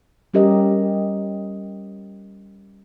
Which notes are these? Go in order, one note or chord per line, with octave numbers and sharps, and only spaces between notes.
G3 C#4 G4 A#4 D#5